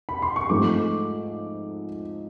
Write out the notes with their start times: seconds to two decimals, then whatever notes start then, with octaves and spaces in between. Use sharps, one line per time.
0.09 B5
0.22 C6
0.36 C#6
0.49 G#2 F3 A3 C4 D6